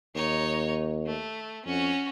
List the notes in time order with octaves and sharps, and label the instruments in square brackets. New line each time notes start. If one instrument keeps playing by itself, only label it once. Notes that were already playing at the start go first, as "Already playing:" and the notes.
[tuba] D#2 [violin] D#4 C#5
[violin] A3
[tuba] F2 [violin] C#4 F#4